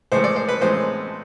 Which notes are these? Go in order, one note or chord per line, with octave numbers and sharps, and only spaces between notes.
A2 E3 G#3 C5
D5
C5
B4
A2 E3 G#3 C5